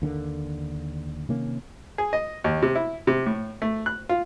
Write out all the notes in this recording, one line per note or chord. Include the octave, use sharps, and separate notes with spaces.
D#2 D3 F#3 A#3
C3 D#3 A#3 C#4
G#4
D#5
D#2
C3
E4
C3
A2
A3
F#6
F4